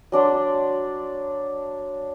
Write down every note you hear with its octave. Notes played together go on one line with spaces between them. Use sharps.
F#3 D4 D5 C6